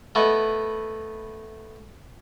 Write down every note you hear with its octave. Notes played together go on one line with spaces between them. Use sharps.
A3 B3 E4 D#5